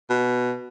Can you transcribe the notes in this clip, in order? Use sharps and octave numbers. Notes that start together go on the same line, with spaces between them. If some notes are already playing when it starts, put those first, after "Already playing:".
B2